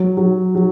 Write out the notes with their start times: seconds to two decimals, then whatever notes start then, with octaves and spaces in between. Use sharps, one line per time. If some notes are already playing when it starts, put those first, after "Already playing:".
Already playing: F#3
0.17 F#3
0.55 F#3